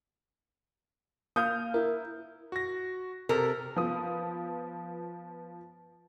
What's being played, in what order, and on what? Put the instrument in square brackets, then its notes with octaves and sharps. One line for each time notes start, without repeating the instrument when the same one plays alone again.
[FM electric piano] A#3 F5 F6 [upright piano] D#6 G6
[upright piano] E4 [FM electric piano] A#4
[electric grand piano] F#4 A#6
[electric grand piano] C3 A4 [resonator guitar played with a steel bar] A#4
[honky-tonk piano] F3 B3 D#6